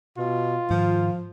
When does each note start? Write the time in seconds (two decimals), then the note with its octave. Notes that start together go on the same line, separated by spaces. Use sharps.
0.18 B2 F4
0.70 G#2 D#3 F3